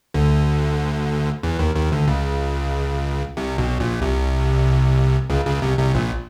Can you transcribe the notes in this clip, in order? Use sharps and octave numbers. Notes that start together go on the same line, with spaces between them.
D2 D3
E2 E3
D#2 D#3
D#2 D#3
D2 D3
C#2 C#3
C2 C3
B1 B2
A#1 A#2
C2 C3
C#2 C#3
C#2 C#3
C2 C3
C2 C3
A#1 A#2